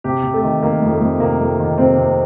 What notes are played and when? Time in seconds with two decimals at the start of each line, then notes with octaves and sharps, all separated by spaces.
0.04 C3 G4
0.23 C3
0.34 A3
0.43 D#3
0.62 D#3 A#3
0.82 F2
0.91 A3
1.01 F2
1.20 C3 A#3
1.40 F2
1.59 D#3
1.78 C3 C4
1.98 C3